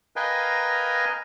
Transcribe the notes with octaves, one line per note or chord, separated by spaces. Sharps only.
A#4 B4 D#5 F5 G5 G#5